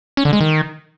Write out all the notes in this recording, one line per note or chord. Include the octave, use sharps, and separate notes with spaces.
C#4
D3
G#3
D#3